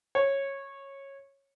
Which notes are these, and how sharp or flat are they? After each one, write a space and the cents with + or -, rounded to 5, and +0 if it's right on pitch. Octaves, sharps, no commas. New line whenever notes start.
C#5 -15